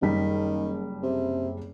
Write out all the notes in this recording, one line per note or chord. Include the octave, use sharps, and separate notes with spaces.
F#1 D#3 G3 B6
C3